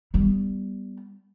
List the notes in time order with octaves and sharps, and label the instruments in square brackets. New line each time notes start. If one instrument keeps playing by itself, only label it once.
[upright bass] G3 B3